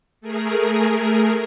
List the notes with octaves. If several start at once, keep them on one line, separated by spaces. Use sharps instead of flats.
A3 G#4 A#4